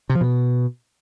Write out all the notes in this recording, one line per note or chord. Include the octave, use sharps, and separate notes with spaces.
C3
F3
B2